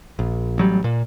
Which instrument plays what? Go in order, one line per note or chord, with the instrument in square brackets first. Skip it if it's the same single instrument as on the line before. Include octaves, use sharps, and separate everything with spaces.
[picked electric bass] A#1
A1 F#3 G3
A#2